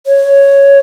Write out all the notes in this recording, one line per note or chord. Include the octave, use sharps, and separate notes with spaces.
C#5